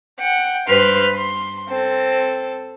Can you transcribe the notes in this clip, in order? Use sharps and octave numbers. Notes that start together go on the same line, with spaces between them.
F#5 G5
G2 B4 C5 C6 F6
C6
C4 A4